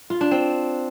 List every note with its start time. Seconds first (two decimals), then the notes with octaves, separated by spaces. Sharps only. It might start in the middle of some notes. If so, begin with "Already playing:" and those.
0.10 F4
0.21 D4
0.31 C4